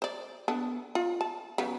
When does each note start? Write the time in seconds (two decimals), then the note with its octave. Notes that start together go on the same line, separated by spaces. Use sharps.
0.02 C5 D5
0.48 B3 D4 A4
0.95 F4
1.21 A5
1.58 C#3 F#3 B3